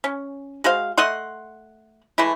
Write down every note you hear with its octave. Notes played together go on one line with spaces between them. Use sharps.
C#4
G#3 F#4 C5 F5
A3 D#5 F#5 C6
E3 G#3 A3 E4